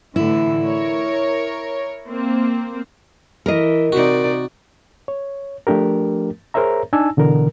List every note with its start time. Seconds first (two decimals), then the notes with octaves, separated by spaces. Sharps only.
0.16 A2 D3 E3 E4
0.64 A#4 C#5
2.07 A#3 C4
3.46 E3 A#4 D#5
3.92 C3 D#4 F#4 D5
5.08 C#5
5.67 F3 A3 D4 G4 A#4
6.54 G#4 A#4 C5 C#5 E5 A#5
6.93 D4 D#4 G#5 A5 E6
7.17 B2 D3 E3 A#4